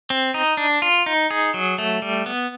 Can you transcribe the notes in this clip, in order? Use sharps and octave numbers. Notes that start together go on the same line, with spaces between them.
C4
D#4
D4
F4
D#4
G#4
F#3
A3
G3
B3